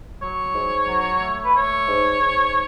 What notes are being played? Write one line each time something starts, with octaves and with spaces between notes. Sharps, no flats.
F#3 C#5
G#2
F#3
A3
B4
A3 C#5
G#2
G#2